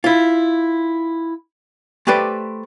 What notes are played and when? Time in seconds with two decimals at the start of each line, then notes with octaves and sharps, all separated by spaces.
0.04 E4 F4
2.07 A3 G4 B4 C5 D5